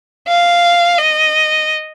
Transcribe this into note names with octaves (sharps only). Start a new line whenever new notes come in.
F5
D#5